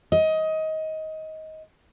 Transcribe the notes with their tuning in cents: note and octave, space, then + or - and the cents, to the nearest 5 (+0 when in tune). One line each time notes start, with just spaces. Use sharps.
D#5 +20